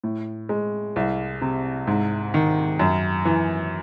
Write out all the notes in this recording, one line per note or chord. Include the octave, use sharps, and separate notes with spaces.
A2
G#3
C2
C3
G#2
D#3
F#2
E3